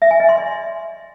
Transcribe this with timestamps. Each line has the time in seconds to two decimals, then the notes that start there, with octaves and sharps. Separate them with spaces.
0.02 E5
0.11 G#5
0.20 D#5
0.29 C6
0.38 D5